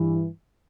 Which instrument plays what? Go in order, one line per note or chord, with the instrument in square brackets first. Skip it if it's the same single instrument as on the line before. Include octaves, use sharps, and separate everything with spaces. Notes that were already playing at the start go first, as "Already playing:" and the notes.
Already playing: [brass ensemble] G2 E3